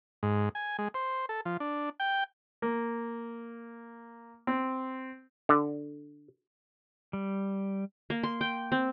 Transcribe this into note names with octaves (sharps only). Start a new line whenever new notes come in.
G#2
G#5
G#3
C5
A4
F3
D4
G5
A#3
C4
D3
G3
A#3
C6
G5
C4